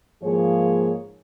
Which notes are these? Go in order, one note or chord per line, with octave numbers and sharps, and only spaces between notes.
G#2 F3 A#3 G#4 C#5